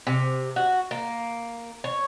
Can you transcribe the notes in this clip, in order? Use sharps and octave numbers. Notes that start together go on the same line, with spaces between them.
C3
F#4
A#3
C#5